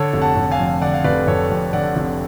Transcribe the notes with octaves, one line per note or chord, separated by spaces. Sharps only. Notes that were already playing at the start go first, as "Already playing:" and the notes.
Already playing: D3 A4 C#5
F1
F#5 A5
F1
F5 G#5
F2
D3 D5 F#5
F5
F1 B4 D5
F1 A4 C#5
F2
D3 D5 F#5
F1